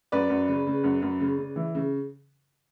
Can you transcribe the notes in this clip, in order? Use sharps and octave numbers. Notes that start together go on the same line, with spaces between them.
F#2 B4 D5
F#2
C#3
C#3
F#2
F#2
C#3
C#3
E3
C#3